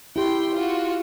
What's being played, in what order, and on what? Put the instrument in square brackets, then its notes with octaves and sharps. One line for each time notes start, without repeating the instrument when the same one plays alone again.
[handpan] E4 G4 [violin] G5 C6
[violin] F4 F#4